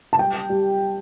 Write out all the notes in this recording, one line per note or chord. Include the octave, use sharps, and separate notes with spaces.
A5
G3 G5
G3